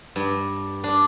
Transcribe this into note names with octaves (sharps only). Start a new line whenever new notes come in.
G2
D4